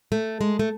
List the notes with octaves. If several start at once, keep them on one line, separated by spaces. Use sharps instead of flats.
A3
G#3
A3